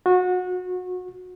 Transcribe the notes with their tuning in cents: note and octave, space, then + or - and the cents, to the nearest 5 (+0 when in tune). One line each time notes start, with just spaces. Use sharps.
F#4 -25